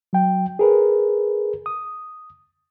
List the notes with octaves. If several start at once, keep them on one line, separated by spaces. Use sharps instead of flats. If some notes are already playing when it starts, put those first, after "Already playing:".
F#3 G5
G#4 A#4 B4
D#6